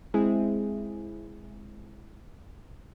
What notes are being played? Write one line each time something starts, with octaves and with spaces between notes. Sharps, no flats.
G#3 C4 E4 G#4